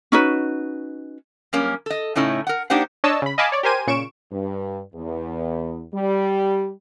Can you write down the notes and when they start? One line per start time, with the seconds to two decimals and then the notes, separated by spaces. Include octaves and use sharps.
0.12 C#4 D#4 F#4 B4
1.53 F#2 G3 A#3 C#4
1.86 A4 D#5
2.16 A2 C#3 A3 C#4 D#4 E4
2.47 A#4 F#5
2.70 A#3 D4 D#4 G4 C5 F#5
3.04 D4 C#5 D#5 A5 E6
3.22 C#3 B5
3.38 D#5 F5 G#5 A5 B5 D6
3.52 C#5 D5
3.63 G4 A#4 C5 G#5 D#7
3.87 A#2 C#3 C#6 D7 E7
4.30 G2
4.94 E2
5.94 G3